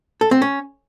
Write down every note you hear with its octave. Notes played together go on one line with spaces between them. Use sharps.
A4
C4
C#4